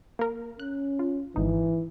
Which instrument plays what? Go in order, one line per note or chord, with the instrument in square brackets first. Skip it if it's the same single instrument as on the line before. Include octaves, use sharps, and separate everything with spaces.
[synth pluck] A#3 A#4
[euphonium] C#4 [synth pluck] F#6
[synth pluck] F4
[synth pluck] G#1 D#4 [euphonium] E3